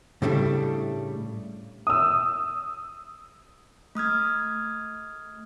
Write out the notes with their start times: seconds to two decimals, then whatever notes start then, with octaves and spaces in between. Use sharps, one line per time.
0.22 A2 C#3 G3 A3 D4
1.87 D#6 E6
3.95 A3 D#6 F6 G#6